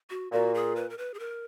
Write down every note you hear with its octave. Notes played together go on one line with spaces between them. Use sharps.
F#4
A#2 F#4
G#4
B4
A#4
B4
G#4
A#4